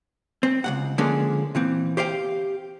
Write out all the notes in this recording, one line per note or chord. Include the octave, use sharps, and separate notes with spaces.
C4
C#2 F#2 F#5
D3 F3 G#3 A#3 C#4 D4
A#2 E3 C4
G4 C5 F5 G5